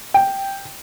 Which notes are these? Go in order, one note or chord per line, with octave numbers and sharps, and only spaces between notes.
G5